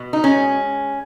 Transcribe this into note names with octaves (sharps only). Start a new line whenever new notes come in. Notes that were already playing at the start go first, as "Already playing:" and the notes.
Already playing: B2
D#4
G#3 C#4